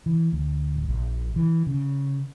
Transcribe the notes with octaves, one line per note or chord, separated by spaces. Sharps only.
E3
D2
D1
A#1
E3
C#3